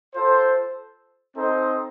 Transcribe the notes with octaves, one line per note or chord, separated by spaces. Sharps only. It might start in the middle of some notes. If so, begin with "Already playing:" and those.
F4 A4 C5
C4 D#4 A4 C5 D#5